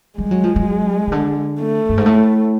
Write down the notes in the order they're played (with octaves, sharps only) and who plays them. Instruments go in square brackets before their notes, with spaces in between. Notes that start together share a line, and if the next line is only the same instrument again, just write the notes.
[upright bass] G3 [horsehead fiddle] G#3
[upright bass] F#3
F3
F#3
C#3
D3
[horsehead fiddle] A3
[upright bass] G2
G#2
A2